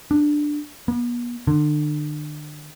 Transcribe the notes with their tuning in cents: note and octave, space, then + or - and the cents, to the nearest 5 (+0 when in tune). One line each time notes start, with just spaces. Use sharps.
D4 +10
B3 -40
D3 +35